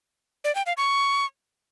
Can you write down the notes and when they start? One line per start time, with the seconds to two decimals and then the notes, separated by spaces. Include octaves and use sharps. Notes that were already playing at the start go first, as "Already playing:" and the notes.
0.44 D5
0.55 G5
0.66 F5
0.77 C#6